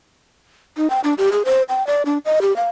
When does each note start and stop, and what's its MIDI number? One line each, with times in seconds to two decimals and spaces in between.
0.77 0.90 63
0.90 1.00 79
1.04 1.14 62
1.18 1.30 67
1.32 1.43 68
1.45 1.62 72
1.69 1.86 79
1.87 2.03 74
2.06 2.18 62
2.25 2.39 75
2.42 2.55 67
2.56 2.69 77